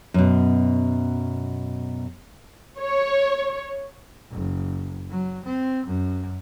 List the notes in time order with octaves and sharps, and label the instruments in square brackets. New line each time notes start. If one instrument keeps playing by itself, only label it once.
[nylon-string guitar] F#2 B2
[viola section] C#5
[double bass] F#1
F#3
C4
F#2